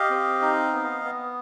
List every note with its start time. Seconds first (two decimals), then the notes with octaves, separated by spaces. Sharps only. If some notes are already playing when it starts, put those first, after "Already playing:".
Already playing: G4 D#5 F5
0.10 C4
0.42 D#4
0.73 B3
1.05 B3